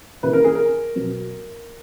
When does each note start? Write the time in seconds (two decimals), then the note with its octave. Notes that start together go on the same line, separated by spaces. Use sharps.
0.23 D#2 C#3 E3 B4
0.33 A#4
0.44 G#4
0.55 A#4
0.95 B2 F#3